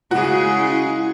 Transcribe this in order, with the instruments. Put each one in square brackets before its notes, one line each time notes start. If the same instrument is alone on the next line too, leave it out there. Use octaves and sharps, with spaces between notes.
[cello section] C#3 G#3 G#4 [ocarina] E4 [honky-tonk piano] F#4